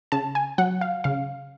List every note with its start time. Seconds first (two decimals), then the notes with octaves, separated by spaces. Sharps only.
0.12 C#3 A5
0.35 G#5
0.58 F#3 F#5
0.81 F5
1.04 C#3 F5